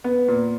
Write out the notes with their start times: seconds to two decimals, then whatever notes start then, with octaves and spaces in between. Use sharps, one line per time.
0.04 B3
0.28 A#2